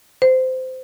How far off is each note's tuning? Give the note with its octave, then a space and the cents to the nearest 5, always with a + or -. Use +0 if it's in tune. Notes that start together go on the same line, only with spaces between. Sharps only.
C5 -20